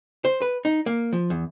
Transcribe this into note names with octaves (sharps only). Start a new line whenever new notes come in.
C5
B4
D#4
A#3
F3
E2